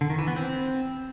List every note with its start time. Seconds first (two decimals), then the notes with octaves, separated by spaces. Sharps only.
0.01 D3
0.10 D#3
0.19 E3
0.27 B3
0.36 C4